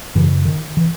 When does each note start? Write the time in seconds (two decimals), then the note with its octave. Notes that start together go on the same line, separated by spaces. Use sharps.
0.15 F#2 C#3 E3
0.45 D#3
0.77 E3